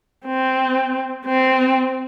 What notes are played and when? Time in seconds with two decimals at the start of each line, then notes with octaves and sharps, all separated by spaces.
0.26 C4
1.26 C4